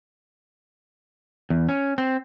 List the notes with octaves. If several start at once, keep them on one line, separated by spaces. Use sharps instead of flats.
E2
C#4
C4